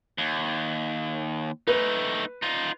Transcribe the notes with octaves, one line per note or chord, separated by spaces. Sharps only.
D#2
A3 D#4 B4
D#4 F4